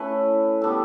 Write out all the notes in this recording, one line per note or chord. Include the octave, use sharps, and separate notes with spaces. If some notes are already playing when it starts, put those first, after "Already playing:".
Already playing: A3 C#4 E4 B4
G3 B3 D4 A4